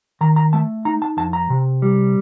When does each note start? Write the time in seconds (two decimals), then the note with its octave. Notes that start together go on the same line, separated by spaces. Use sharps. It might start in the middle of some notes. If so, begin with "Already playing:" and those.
0.21 D#3 A#5
0.36 A#5
0.53 A3 A5
0.85 D#4 A#5
1.02 A5
1.17 F2 A5
1.33 A#5
1.50 C3
1.82 G3